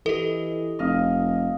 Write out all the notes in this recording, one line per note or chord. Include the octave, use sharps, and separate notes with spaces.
E3 G4 A4 D#5
F1 D#5 F5